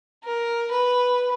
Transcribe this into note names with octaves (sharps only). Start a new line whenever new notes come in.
A#4
B4